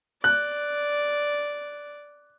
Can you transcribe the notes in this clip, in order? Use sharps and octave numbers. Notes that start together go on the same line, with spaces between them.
D5 F#6